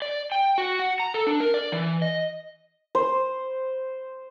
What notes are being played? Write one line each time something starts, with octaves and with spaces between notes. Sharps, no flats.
D5
G5
F#4
F#5
A#5
A4
D4
A#4
D5
E3
D#5
C5